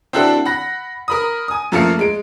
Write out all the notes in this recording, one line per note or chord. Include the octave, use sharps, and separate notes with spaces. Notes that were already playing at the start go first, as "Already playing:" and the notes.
C4 D4 E4 F#4 A4
F#5 B5 A#6
A#4 B5 D#6
G#5 D#6
F#2 F3 A3 A#3 F5 C#7
G#3 D7